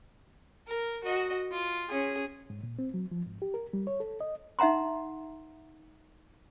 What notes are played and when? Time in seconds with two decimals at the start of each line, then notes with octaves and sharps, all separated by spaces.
0.67 A#4
1.04 F#4 D#5
1.51 F4
1.89 C#4 G#4
2.50 G#2
2.63 A#2
2.79 C4
2.94 F#3
3.11 F3
3.26 G#2
3.42 G4
3.54 A#4
3.73 G3
3.87 C#5
4.00 A4
4.21 D#5
4.59 D#4 E5 F#5 A#5 C6